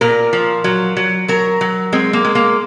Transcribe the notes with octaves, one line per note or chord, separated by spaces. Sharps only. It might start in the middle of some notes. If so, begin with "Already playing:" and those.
A#2 A#4
F3
F#3
F#3
F#3 A#4
F#3
G#3 C4
A#3
G#3
A#3